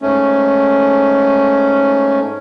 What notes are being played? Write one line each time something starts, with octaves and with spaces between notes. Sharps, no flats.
G#2 A3 C#4